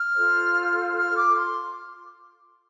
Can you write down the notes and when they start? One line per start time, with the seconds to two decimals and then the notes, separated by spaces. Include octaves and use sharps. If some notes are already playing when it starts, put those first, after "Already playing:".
Already playing: F6
0.14 F4 A4 C5
0.96 F6
1.17 D6
1.36 C6